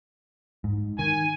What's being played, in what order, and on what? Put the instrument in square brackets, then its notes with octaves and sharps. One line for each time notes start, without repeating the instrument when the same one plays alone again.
[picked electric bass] G#2
[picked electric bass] D#3 [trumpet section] G#5